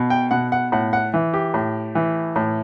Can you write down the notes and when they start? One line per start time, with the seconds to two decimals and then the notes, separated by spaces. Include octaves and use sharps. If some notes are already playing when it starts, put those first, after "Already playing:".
Already playing: B2
0.10 G5
0.31 B2 F#5
0.52 F#5
0.72 A2 F#5
0.93 F#5
1.14 E3
1.34 G4
1.54 A2
1.95 E3
2.36 A2